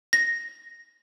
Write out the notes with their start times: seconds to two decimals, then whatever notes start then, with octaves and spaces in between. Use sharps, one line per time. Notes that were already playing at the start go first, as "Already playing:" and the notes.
0.13 A#6